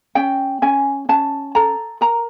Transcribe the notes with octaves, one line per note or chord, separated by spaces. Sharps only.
C#4 G5
C#4 G#5
C#4 A5
A4 A#5
A#4 A#5